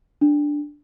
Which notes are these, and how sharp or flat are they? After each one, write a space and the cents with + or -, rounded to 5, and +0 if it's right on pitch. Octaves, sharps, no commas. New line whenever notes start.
D4 +0